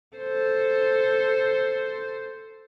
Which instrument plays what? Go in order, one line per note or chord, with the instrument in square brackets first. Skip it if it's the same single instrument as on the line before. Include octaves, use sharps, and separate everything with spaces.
[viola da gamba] A4 C5